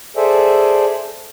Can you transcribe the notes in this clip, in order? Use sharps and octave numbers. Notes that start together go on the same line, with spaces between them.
G#4 A4 C5 D5 E5 G#5